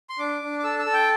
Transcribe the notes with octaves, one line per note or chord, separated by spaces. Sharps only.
C6
D4 D6
D4
D6
A4 E6
E6
A4
G5